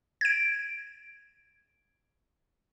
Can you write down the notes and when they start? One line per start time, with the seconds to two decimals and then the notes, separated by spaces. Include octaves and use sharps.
0.21 G#6 D7